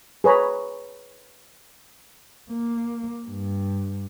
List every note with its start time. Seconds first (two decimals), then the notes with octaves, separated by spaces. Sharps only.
0.24 G#4 B4 C#5 A#5 B5
2.50 A#3
3.27 G2